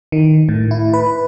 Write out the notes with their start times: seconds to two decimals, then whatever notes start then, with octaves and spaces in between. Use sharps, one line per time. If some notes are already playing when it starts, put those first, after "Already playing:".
0.12 D#3
0.49 A2
0.71 E4
0.93 B4